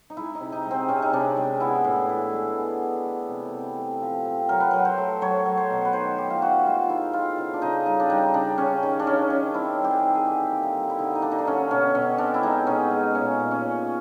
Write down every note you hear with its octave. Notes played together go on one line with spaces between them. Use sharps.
D#4
G#3 E4
D#4
C3
D#4
G#3
C4
C3 C#4
D#4
C3 D4
G#3
B3 E4
A2
E3
G#3
B3
B3
A3
C3
C4
A3
F3
C4
F#3 A#4
B4
F#3 A#4
C5
A3
F#3 C#5
F#3
C5
B2
B4
D#3 C5
D#3 G4
F4
D#3 F#4
G#3 F4
D#3 D#4 E4
D#3 F4
C#3 F4
D4
C#3 D#4
G3 D#4
D4
G3 D#4
C#3 D4
C#3 C#4
D#3
D4
D#3 C#4
D#3 D4
C4 E4
G3
G4
G#4
D#3
G#4
D3 G4
A#3
D#4
G3
E4
D3 D#4
D#4
A#3 D4
D#4
D4
D3 C#4
B2 C#4
B2 C#4
C4 D4
E4
G#3 D#4
B2 C#4
G#3
A#2 C#4
A#2
C#4
A#2